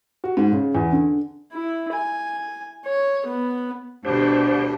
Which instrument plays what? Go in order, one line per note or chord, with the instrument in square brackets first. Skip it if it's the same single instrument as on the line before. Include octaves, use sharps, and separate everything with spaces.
[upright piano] F#4
G#2
C#3
E2
D3
[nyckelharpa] E4
G#5
C#5
B3
[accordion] D2 G3 D4 [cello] B2 D3 [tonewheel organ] G4 C5